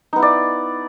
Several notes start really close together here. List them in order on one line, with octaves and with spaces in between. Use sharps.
D#4 B3 E4 D5